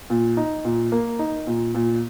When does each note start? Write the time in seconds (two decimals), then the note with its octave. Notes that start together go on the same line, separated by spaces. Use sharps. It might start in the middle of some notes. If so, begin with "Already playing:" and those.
0.10 A#2
0.37 D#4
0.65 A#2
0.92 A#3
1.19 D#4
1.47 A#2
1.75 A#2